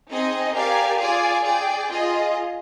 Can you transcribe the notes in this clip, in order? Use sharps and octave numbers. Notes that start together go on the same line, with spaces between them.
C4 D#4 G#4 D#5
G4 A#4 D5 F5 G#5
F4 G#4 D5 G#5
G#4 D5 G5
F4 G#4 D#5